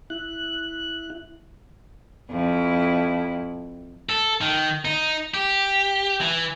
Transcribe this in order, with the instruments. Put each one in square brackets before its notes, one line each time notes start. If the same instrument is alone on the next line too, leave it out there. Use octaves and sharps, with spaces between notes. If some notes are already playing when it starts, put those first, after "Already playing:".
[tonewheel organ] E4 F#6
[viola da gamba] F2 E4
[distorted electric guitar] A4
D#3
D#4
G4
E3